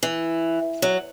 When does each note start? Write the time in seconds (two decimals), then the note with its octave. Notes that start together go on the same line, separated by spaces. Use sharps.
0.03 E3
0.82 F#3